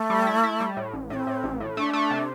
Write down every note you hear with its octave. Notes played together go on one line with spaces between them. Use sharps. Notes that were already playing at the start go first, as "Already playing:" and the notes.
Already playing: A3
G3
E4
E4
G3
A2
A1
A2 C4 D4
A2
A1
A2
A3 D4
A3
C3